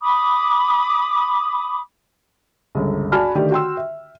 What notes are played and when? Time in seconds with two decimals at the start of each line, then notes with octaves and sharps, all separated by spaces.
0.01 B5 D6 D#6
2.75 G1 C#2
3.12 F#4 D5 G#5 A5 B5 F6
3.35 D3 D#3 A3 G4 D5
3.51 F#4 G5 C6 E6
3.77 E5